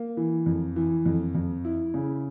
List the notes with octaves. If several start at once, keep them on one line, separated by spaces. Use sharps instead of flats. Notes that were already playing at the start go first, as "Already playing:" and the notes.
Already playing: A#3
E3
F2
E3
F2
F2
E4
C#3